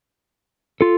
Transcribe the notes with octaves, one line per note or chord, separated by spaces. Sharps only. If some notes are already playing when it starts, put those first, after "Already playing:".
F4 A4